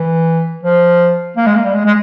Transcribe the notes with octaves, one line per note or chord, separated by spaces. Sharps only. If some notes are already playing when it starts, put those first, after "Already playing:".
Already playing: E3
F3
A#3
G#3
A#3
G3
G#3
G#3